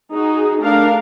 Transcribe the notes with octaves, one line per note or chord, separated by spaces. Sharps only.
D#4 F#4 G#4
A3 D4 A#4 F5